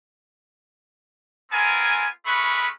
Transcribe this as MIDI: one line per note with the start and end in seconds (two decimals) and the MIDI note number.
1.51 2.06 59
1.51 2.06 60
1.51 2.06 65
1.51 2.06 70
1.51 2.06 80
2.25 2.67 56
2.25 2.67 57
2.25 2.67 61
2.25 2.67 71
2.25 2.67 83
2.25 2.67 85